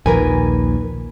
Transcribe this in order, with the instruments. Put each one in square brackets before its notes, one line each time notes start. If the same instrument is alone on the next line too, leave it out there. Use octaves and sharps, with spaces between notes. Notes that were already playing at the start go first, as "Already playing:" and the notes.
[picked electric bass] A#1 D#2 [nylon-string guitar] A#4 B4 G#5